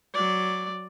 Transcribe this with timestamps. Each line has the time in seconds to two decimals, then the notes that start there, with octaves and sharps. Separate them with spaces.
0.14 F#3 D5